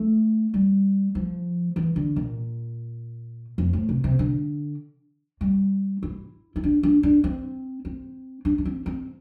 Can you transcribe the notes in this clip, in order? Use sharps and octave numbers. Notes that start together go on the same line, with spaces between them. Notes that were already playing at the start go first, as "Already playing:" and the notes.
Already playing: A3
G3
F3
E3
D3
A#2
F2
A2
C3
C3
D3
G3
E4
E4
D4
D4
D4
C4
C4
D4
D4
C4
C4